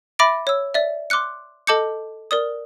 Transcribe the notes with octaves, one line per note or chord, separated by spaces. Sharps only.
E5 B5 D6 A6 A#6 D7
C#5 E6
D5 E5
C6 D6 F6 F#6 C#7
A4 D#5 A5 D6 G6 C#7
A#4 D5 D#6